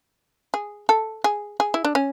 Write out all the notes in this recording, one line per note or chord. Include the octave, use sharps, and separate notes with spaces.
G#4
A4
G#4
G#4
E4
D4
C#4